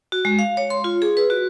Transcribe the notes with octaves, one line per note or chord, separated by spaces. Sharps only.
F#4
G#3
F5
C#5
C6
F4
G#4
B4
F#4